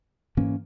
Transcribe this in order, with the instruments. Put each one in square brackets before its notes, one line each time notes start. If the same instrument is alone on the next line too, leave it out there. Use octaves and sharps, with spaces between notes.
[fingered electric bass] G#2 E3 A#3 C#4